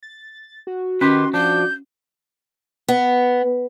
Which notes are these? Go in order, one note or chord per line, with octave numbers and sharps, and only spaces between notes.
A6
F#4
D#3 C#4 G4 B4 C6
F3 D4 G6
B3